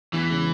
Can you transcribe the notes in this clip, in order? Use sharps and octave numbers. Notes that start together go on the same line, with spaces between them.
E2 E3
C#3 G#3